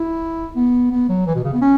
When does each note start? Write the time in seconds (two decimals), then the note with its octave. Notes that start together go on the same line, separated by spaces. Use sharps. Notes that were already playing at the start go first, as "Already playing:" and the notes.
Already playing: E4
0.56 B3
0.91 B3
1.09 F#3
1.26 E3
1.35 B2
1.44 C#3
1.53 B3
1.62 C#4